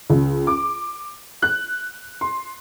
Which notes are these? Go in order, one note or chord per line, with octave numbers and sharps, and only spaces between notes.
C#2
D6
F#6
C6